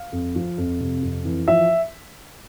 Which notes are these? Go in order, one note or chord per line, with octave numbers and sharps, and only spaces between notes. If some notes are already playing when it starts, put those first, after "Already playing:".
Already playing: F5
F2
F3
F2
C3
F2
E3
F3 E5